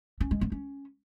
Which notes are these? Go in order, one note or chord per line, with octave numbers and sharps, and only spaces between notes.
C#4
G#3
B3
C#4